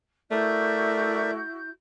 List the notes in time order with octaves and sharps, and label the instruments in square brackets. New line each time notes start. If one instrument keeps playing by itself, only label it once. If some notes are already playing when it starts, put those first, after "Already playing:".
[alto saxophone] A3 [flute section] E4 F#4 G6 [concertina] A#4 D5 E5